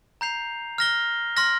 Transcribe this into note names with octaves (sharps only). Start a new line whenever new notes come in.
A#5 G6 C7 F7
F6 A#6 G7
C6 F6 A#6